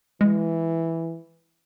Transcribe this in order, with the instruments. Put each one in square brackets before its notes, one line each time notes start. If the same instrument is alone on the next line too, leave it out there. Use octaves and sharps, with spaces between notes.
[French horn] E3 [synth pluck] G#3